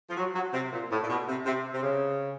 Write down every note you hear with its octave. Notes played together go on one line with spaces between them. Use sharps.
F3
F#3
F#3
C3
A#2
A2
A#2
B2
C3
C3
C3
C#3